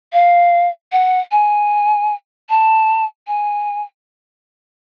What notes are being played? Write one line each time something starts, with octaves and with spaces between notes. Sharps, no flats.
F5
F#5
G#5
A5
G#5